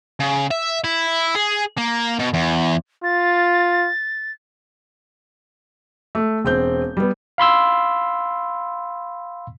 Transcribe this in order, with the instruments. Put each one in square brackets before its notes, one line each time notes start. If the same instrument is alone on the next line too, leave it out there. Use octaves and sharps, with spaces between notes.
[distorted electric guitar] C#3
E5
E4
G#4
A#3
B2
E2
[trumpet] F4 [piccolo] A6
[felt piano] A3
E1 C4 G6
G3 B3
[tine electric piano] F5 B5 C6 E6